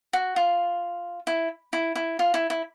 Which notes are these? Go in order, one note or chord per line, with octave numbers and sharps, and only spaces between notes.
F#4
F4
E4
E4
E4
F4
E4
E4